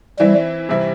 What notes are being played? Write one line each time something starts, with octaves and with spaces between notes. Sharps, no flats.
E3 G3 C4 E4
C3 E3 G3 C4 E4